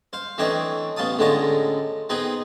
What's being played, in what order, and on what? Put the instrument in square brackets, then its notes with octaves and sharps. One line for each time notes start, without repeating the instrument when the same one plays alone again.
[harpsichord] C5 F5
E3 A3 C4 D4 C#5 D#5
A1 B3 F5 A5 D#6
A2 D3 G#3 C#4 F4 A#5
B3 C4 D#4 G#4 B4